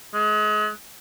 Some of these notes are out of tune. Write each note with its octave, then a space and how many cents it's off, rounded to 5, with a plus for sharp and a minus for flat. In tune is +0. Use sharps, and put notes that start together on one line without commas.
G#3 +35